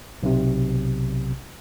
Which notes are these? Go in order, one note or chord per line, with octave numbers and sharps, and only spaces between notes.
B1 C3